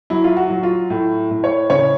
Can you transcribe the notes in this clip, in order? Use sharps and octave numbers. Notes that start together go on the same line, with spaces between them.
F#3 E4
F4
F#4
F#3
F4
A2
A2
C#5
C#3 C#5